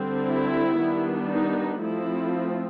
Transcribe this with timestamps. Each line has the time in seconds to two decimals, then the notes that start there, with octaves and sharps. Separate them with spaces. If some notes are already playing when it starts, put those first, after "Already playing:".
Already playing: D3 G3 C4
0.27 E4
0.79 D#3 G3 B3 D4
1.29 D#4
1.81 F3 A3 C4 E4